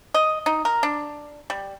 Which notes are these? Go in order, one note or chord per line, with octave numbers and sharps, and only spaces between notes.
D#5
D#4
A#4
D4
G3